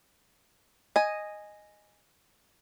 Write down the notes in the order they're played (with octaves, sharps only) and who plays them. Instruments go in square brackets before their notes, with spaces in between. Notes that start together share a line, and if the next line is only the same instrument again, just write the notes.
[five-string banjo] D#5 G#5